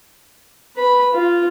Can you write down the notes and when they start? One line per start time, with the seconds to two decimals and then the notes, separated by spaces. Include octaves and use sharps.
0.76 B4 B5
1.12 F4